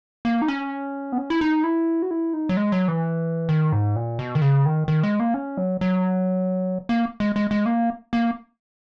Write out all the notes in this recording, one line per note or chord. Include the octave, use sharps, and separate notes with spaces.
A#3
D#4
C#4
B3
C#4
E4
D#4
E4
F#4
E4
D#4
F#3
G#3
F#3
E3
D#3
G#2
A#2
B2
D#3
C#3
D#3
D#3
G#3
A#3
C#4
F#3
F#3
A#3
G#3
G#3
G#3
A#3
A#3